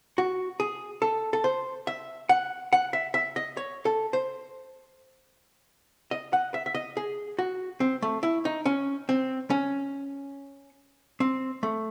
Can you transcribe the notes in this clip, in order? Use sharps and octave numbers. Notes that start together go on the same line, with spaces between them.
F#4
G#4
A4
A4
C5
E5
F#5
F#5
E5
E5
D#5
C#5
A4
C5
D#5
F#5
E5
E5
D#5
G#4
F#4
C4
A3
E4
D#4
C#4
C4
C#4
C4
A3